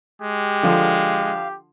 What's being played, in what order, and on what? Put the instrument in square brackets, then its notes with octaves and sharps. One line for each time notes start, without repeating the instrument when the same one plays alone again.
[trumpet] G#3 [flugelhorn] G4
[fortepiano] D3 F3 [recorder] F5